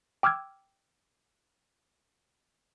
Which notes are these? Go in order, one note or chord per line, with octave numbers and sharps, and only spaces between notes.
G5 D6 E6 F6 G#6